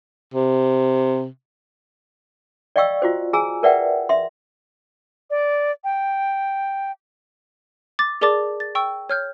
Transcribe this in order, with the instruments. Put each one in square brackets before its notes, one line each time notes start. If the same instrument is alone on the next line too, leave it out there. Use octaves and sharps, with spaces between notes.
[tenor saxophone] C3
[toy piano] D5 D#5 F5 G5 C#6 E6
F4 F#4 C5
G#4 G#5 A#5 E6
A#4 B4 D5 E5 F#5 G5
E5 C6
[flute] D5
G5
[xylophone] D6 A6
G#4 A#4 D5 A5 D6 A6
A6
G5 C#6 E6
C#5 F6 G6